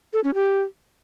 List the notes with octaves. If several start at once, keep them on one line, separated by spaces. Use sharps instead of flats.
A4
C#4
G4